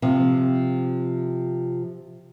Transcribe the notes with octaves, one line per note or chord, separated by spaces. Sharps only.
C3 F3